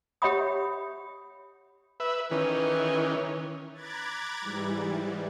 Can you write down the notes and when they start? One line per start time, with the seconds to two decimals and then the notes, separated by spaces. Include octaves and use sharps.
0.22 G4 C#5 E5 F#5 B5 D#6
2.00 B4 E5
2.31 D#3 E3 C#4
3.73 A#5 B5 D6 F#6 G#6 A6
4.41 G#2 E3 G3